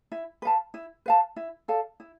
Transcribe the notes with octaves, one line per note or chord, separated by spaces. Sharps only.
E4
B4 F5 A5
E4
B4 F5 A5
E4
A4 D5 F5
E4